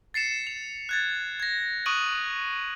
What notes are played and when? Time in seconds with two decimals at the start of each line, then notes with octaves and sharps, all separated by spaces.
0.14 A6 C7 C#7 E7
0.47 F7
0.89 F#6 G#6 A6
1.40 G#6 A#6
1.86 C#6 D#6 F#6 D7 D#7 F#7